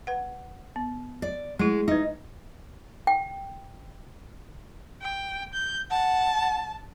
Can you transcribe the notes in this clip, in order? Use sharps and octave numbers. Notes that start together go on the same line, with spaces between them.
B4 F#5
B3
D5
G#3 A3 E4
G#3 D#4 B4
G5
G5
G6
F#5 A5